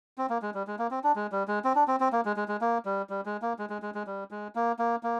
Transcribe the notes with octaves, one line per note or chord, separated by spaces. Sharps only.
C4
A#3
G#3
G3
G#3
A#3
C4
D4
G#3
G3
G#3
C4
D4
C4
C4
A#3
G#3
G#3
G#3
A#3
G3
G3
G#3
A#3
G#3
G#3
G#3
G#3
G3
G#3
A#3
A#3
A#3